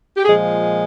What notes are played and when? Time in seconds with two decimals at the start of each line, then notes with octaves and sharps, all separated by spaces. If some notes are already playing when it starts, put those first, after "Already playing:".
0.17 G4
0.25 A#2 F3 G#3 G#4